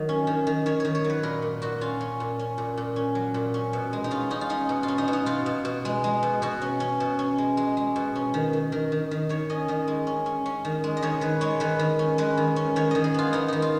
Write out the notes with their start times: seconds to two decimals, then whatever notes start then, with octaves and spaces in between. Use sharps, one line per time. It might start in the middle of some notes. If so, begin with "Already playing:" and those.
Already playing: D#3 F#3
0.09 C#4
0.27 D#3
0.47 D#3
0.66 D#3 C#5
0.80 D#3 C#5
0.95 C#5
1.04 F#3
1.10 B4
1.23 A#2 A#4
1.42 A#2
1.62 A#2 F#4
1.81 C#4 F4
2.01 C#4
2.20 A#2
2.39 C#4
2.58 A#2
2.77 A#2
2.96 C#4
3.15 F#3
3.34 A#2
3.54 C#4
3.73 B2
3.93 G#3
4.04 D#4
4.11 C#4 F4
4.30 C#4 D#4
4.41 F4
4.50 C#4 D#4
4.69 B2
4.83 F4
4.88 C#4
4.98 D#4
5.08 B2
5.13 D#4
5.26 B2 F4
5.46 B2
5.65 B2
5.85 G#3
6.04 G#3
6.23 B2
6.42 B2 F#4
6.62 C#4
6.80 C#4
7.00 B2
7.19 C#4
7.38 G#3
7.57 G#3
7.77 G#3
7.96 B2
8.16 C#4
8.34 D#3
8.53 D#3
8.72 D#3 A#4
8.92 D#3
9.11 D#3
9.29 D#3 C#5
9.50 C#4 D#5
9.68 D#3 D#5
9.88 G#3
10.07 C#4
10.26 C#4
10.46 C#4
10.65 D#3
10.84 G#3
10.97 D#5
11.02 D#3 C#5
11.21 D#3 B4
11.41 G#3 C#5
11.60 D#3 B4
11.79 D#3
11.99 C#4
12.18 G#3 B4
12.37 D#3
12.56 C#4
12.76 D#3 C#5
12.91 D#3 D#5
13.04 G#4
13.14 B3 F4
13.33 B3 D#4
13.48 D#3 D#4
13.62 F4